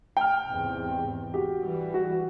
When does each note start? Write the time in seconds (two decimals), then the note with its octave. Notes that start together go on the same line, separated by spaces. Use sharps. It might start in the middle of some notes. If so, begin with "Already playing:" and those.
0.17 G5 F6
0.47 E2 G#2 C3
1.34 F#4 G4
1.62 E3 G3
1.94 F#4